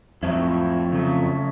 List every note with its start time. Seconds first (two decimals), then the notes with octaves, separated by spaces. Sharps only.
0.23 F2 A2 F#3 A3 C4 E4
0.92 C#3 F#3 A3